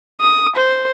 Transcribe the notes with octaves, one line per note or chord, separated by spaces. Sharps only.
D#6
C5